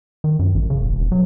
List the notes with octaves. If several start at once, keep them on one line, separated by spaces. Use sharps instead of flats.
D#3
F#2
A1
C#3
E1
E1
F#3